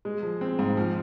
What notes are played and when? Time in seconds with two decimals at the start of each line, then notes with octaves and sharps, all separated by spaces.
0.05 G#3
0.23 F3
0.41 C4
0.59 G#2
0.77 F3